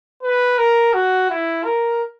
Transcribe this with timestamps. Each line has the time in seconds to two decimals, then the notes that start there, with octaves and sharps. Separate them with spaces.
0.23 B4
0.58 A#4
0.93 F#4
1.30 E4
1.65 A#4